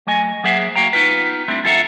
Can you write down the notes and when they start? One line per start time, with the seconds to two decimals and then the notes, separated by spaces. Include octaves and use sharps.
0.07 F#3 A3 D#5 G#5
0.44 F#3 A#3 G#4 C5 E5 F#5
0.76 A#3 F#4 F5 G5 A#5
0.93 B3 D#4 F4 B4
1.48 G3 A3 C4 D4 E4
1.64 F2 F4 A4 E5 F#5 A#5